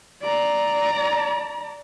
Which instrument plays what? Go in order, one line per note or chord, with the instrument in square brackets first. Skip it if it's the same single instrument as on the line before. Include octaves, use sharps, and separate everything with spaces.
[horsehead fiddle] D5 A#5